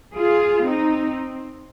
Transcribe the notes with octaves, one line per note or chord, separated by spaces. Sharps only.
F4 G#4
C4 D#4